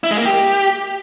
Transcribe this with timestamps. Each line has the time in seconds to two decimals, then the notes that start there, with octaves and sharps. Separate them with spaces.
0.04 E4
0.11 G#3
0.18 A#3
0.25 G4